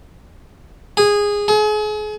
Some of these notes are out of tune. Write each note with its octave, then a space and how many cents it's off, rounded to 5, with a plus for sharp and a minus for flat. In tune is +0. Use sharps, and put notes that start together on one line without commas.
G#4 -15
G#4 +35